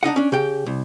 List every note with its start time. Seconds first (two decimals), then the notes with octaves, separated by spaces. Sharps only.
0.03 D4 D#4 D#5 F#5
0.16 C#4 D4
0.32 C#3 G4 G5
0.66 C2